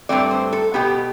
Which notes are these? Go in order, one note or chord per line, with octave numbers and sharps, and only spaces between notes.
G2 E3 A3 C4 D5
C5
A4
B2 B3 G4